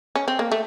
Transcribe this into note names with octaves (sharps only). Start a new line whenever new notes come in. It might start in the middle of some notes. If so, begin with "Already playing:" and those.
C#4
C4
A#3
A3